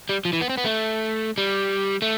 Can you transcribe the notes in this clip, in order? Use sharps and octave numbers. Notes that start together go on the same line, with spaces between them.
G3
F3
E3
B3
C4
B3
A3
G3
A3